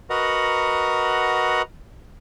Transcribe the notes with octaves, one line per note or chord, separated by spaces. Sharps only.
F#4 A#4 B4 D#5 F#5 A#5